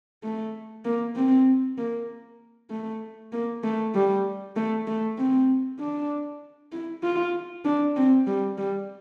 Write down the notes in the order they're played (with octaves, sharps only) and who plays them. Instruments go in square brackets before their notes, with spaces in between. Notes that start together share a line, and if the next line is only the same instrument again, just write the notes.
[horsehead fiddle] A3
A#3
C4
A#3
A3
A#3
A3
G3
A3
A3
C4
D4
E4
F4
D4
C4
G3
G3